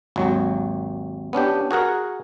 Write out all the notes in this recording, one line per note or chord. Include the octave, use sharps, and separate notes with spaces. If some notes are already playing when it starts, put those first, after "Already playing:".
G#1 D#2 F#3
B3 C#4 D4 G4
F#4 G#4 A#4 F#5